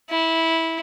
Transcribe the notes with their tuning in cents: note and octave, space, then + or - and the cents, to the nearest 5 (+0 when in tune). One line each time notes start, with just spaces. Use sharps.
E4 -15